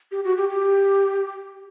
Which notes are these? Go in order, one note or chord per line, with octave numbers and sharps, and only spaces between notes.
G4
F#4
G4
G4